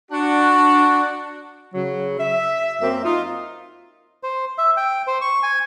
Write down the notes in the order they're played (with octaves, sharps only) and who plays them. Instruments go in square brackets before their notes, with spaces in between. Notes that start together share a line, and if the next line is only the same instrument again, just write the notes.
[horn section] D4 F#4
[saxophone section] C#3 F#3
E5
F#2 A#3 C4 E5
D#4 F4
[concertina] C5
E5
G5
C5
C#6
G#5